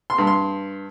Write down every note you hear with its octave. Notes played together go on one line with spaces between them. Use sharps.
C6
G2
C6